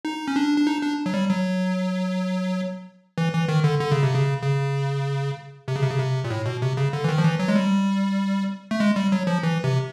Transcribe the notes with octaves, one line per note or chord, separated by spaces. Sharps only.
D#4
C#4
D4
D4
D#4
D4
F#3
G3
F#3
E3
E3
D#3
D3
D3
C#3
C3
C#3
C#3
C3
C#3
C3
C#3
C3
A#2
A2
B2
C3
C#3
D3
E3
D#3
F3
E3
F#3
G#3
G3
A3
G#3
G3
F#3
F3
E3
C3